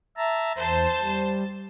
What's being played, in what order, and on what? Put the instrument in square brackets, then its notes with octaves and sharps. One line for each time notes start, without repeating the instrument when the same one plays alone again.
[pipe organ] E5 A5 A#5
[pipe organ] E2 [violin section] C5 A5
[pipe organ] G3